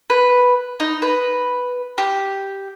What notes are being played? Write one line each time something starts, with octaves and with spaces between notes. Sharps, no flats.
B4
D#4
B4
G4